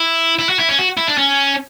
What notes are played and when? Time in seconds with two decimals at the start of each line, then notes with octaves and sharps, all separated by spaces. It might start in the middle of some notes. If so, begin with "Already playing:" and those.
Already playing: E4
0.39 E4
0.49 F#4
0.59 E4
0.69 C#4
0.79 F#4
0.97 E4
1.08 D4
1.17 C#4